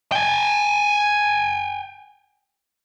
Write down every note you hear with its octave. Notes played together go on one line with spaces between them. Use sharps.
G5 G#5